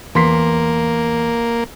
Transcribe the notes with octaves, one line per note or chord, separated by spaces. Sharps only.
E2 A#3 C6 B6